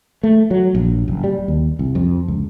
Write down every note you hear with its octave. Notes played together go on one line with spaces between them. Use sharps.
A3
F#3
A#1
F#1
G3
D#2
C2
F2
C#2